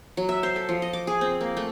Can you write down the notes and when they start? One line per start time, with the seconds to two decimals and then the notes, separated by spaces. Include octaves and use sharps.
0.17 F#3
0.29 E5
0.43 C5
0.56 A4
0.69 F3
0.82 D#5
0.93 D6
1.07 G#4
1.21 C4
1.41 A#3
1.57 A3